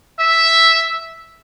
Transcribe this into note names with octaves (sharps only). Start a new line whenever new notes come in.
E5